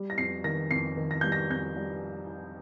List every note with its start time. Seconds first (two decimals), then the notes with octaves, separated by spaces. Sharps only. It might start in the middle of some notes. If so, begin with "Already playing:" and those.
Already playing: G3
0.10 A#6
0.18 F2 C7
0.44 D#3 A#6
0.71 F2 C7
0.97 D#3
1.11 A#6
1.21 G3 G6
1.32 A#6
1.50 F2 G6
1.76 G3